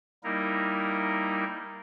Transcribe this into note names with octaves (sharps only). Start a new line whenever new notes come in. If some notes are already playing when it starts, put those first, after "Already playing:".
G3 A#3 D#4 E4 A#4